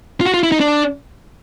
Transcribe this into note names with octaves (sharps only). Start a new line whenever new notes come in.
F4
F#4
F4
E4
D#4
D4